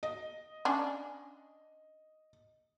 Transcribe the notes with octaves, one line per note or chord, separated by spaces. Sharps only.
D#5
C#4 D4